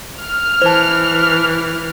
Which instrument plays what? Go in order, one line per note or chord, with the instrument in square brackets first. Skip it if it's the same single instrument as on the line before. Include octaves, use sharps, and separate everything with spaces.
[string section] F6
[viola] E3 [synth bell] C5 A5